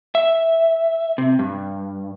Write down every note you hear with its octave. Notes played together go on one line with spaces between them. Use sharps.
E5
C3
G2